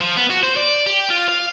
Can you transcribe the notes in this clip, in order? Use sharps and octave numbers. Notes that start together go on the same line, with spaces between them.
F3
B3
F#4
C5
D5
G4
F4
F5